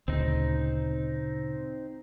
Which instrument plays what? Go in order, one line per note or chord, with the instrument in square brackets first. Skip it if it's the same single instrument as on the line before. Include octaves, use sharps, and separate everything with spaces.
[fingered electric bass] D2 [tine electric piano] A#2 C#3 [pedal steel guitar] C4 D#4